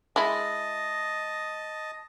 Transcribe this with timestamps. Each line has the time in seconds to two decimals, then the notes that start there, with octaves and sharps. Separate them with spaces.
0.16 G#3 E4 D#5 A5